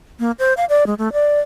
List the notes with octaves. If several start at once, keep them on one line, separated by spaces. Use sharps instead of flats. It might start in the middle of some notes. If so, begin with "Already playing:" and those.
A#3
C5
F5
D5
G#3
A3
D5